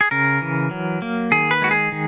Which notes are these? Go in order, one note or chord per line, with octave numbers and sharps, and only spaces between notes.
G#4
C#3 A#4
E3
F#3
A#3
D#3 G#4
B4
G#3 F#4
G#4
D#3